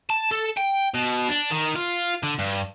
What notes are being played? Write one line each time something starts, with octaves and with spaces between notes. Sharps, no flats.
A5
A4
G5
B2
D4
D#3
F4
D3
G2